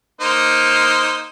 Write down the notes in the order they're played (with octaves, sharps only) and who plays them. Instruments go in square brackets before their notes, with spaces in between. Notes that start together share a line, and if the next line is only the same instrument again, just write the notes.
[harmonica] A#3 D#4 C5